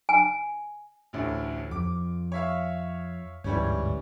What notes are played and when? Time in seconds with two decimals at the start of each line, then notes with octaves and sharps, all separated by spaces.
0.09 G#5
1.13 A1 D2 A2
1.71 F2 D6
2.32 C#5 E5 F5
3.44 G1 D2 G#2 E3 G3 C#4